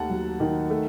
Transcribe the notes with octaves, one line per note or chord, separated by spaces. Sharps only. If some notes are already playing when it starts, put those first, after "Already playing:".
Already playing: D#2 D#3 A3 F#5 A5
F#3
D#3
A3